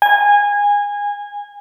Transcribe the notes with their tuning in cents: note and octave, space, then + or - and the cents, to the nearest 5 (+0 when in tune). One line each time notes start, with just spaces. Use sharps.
G#5 -20